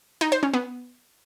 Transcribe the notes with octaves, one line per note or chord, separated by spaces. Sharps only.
D#4
C5
C#4
B3